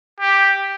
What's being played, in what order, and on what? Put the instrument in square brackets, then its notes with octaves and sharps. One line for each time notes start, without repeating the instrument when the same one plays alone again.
[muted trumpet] G4